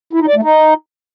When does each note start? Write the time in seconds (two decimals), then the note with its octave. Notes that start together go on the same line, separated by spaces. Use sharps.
0.13 E4
0.20 D#4
0.28 D5
0.35 A3
0.43 D#4